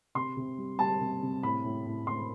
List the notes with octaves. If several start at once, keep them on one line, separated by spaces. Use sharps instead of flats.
C3 C6
C3
G3
G3 A5
C3
C3
A2 B5
A2
A2
A2 C6